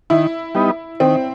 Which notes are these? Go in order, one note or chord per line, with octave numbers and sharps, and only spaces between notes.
D#3 E4
G3 B3 D#4
D#3 C4